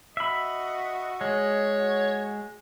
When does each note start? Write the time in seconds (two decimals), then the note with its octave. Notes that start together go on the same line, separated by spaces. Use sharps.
0.17 F#4 D#5 E5 B5
1.21 G#3 C#5
1.75 F#4